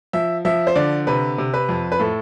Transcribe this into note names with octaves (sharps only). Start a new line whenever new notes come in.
F3 E5
F3 E5
C5
D3 D5
C3 B4
C3
B4
F2
B4
A2 A4